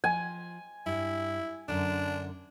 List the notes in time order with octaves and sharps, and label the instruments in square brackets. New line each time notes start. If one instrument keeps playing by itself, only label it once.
[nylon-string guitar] F3 [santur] G#5
[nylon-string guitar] G2 [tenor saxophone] E4
[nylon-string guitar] F#2 D3 [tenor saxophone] D4